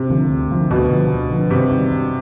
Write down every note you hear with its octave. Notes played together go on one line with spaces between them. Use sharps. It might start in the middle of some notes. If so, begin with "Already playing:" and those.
Already playing: C3
D3 F3 A#3
D2
D3 F3 A#3
D2 B2
D3 F3 A#3
D2
D3 F3 A#3
G2 C3
D#3 G3
G2